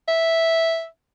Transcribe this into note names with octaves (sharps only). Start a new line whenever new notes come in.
E5